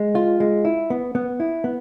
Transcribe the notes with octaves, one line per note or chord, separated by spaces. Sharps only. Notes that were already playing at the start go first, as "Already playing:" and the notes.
Already playing: G#3
F4
G#3
E4
B3
B3
E4
B3